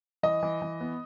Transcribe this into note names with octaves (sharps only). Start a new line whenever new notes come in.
E3 D#5
E3
E3
B3